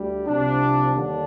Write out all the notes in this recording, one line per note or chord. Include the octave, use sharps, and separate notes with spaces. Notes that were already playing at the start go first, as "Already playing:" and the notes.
Already playing: D2 G3
C2 C3 F3 C4 D4
D#2 D3 G3 D4